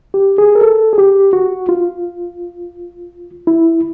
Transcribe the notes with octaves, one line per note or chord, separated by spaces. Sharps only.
G4
G#4
A#4
A4
G#4
G4
F#4
F4
E4